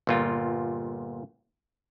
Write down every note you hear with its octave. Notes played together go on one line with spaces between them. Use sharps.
G1 A#2 F4